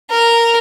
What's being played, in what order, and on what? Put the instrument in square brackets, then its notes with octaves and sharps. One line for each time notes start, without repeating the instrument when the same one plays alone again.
[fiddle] A#4